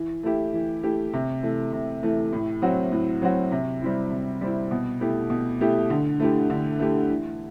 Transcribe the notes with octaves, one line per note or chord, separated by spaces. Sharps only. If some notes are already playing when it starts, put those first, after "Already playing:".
Already playing: E3
A3 E4 G4
E3
A3 E4 G4
C3
E3 A3
C3
E3 A3
A2
F#3 C4 F#4
A2
F#3 C4 F#4
C3
G3 C4 E4
C3
G3 C4 E4
B2
A3 E4 G4
B2
A3 E4 G4
D3
A3 E4 G4
D3
A3 E4 G4
E3